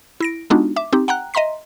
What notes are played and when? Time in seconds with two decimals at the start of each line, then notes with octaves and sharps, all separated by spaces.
0.20 E4 A#6 D7
0.50 G#3 B3 D4 D#4 F4 F#4
0.76 E5 D6
0.93 C4 D#4 G4
1.08 F#5 G5 A#5 F#6
1.34 D#5 E5 A#5 C6 B6